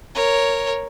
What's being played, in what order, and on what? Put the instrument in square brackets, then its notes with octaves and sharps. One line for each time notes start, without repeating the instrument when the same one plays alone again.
[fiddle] A#4 C#5